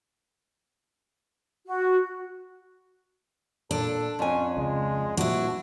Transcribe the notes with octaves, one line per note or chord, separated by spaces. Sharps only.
F#4
A#2 D4 A4
F2 C#4 G#5
C#2 G#3
A#2 F3 G3 D4 E4 F#4